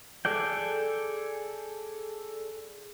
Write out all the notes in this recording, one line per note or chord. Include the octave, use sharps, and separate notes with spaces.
G#4 A4 D5 G5